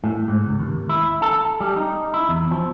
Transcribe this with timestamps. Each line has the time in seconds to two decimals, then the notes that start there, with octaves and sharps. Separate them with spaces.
0.04 A2
0.28 G#2
0.46 C#2
0.59 D#2
0.89 E4
1.22 A4
1.60 G3
1.76 D#4
2.14 E4
2.29 E2
2.51 F3